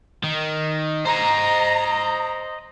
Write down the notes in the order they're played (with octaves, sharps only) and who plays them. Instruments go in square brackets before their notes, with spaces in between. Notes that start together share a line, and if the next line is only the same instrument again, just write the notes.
[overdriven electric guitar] D#3
[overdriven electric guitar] C5 D#5 [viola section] A#5